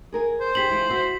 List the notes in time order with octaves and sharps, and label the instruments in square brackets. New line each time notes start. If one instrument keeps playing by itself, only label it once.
[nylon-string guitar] G#4 A#4 G#5
[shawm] C5
[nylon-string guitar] D4 G4 G#4 [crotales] B6 C7 F#7
[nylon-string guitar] E3 G#3 F4
E4 F#4 E5